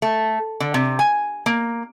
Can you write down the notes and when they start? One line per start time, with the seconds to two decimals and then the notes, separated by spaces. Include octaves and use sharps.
0.02 A3
0.60 D3
0.74 C3
0.99 G#5
1.46 A#3